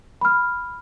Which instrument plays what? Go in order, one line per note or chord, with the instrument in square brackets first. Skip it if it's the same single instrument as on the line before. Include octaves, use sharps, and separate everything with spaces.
[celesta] B5 F6